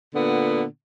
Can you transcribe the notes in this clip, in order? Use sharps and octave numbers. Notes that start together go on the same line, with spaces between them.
A#2 D3 B3